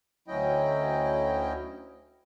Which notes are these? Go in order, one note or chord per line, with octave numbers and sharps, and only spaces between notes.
D2 F#3 C#4 E4 D#5 G5